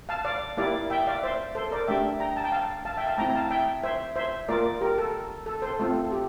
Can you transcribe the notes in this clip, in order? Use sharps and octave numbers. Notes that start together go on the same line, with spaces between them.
F5 A5
D5 F5
A#3 E4 G4 D5 F5
E5 G5
D5 F5
C5 E5
A4 C5
A#4 D5
A3 D4 G4 E5 G5
G5 A#5
A5
G5
F5 A5
F5 A5
E5 G5
F5 A5
A3 C4 E4 G5 A#5
F5 A5
E5 G5
C5 E5
C5 E5
A#3 F4 A#4 D5
G4 A#4
A4
A4
A4 C5
A3 C4 F4 A4
A4
G4